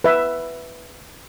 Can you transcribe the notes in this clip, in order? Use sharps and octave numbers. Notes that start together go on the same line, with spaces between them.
B4 E5